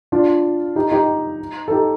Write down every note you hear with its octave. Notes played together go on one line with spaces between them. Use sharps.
D4 F4
D#4 G4
D#4 G4
A4
D#4 G4